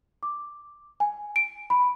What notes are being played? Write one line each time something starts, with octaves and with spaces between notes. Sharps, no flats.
D6
G#5
D7
B5